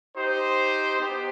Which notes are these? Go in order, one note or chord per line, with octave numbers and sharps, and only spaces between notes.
D#4 G4 C5
B3 D#4 G4